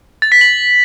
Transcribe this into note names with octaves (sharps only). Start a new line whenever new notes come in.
A6
B6
F#7